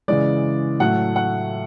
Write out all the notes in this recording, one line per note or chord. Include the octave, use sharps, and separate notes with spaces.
C#3 E3 G#3 D5
A2 F#3 A3 F#5
F#5